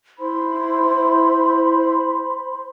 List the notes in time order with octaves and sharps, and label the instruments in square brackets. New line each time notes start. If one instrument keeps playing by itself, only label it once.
[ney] E4 [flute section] C5 B5 C6